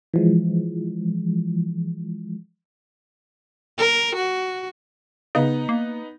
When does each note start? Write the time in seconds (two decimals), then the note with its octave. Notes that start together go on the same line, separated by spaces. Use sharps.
0.14 E3 F3 G#3
3.78 A#4
4.15 F#4
5.35 C#3 B3 D#4
5.69 A#3